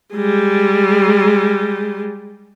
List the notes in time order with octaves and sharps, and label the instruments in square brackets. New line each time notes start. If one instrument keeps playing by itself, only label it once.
[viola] G3 G#3